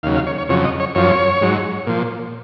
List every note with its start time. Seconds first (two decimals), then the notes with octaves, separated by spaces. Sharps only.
0.03 D#2 F5
0.06 C#3 F#3
0.15 F5
0.27 C#5
0.38 C#5
0.49 F2 C#3 F#3 C#5
0.65 D#5
0.80 C#5
0.95 F#2 F3 C#5
1.41 G#2 F#3
1.87 A#2 F3